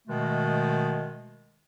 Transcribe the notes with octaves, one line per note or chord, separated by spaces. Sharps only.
B2 D#3 G#3 A3